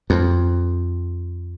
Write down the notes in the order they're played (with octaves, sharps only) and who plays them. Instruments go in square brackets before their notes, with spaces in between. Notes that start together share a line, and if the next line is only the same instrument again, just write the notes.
[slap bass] F2